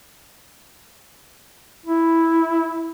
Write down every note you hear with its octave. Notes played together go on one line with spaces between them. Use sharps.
E4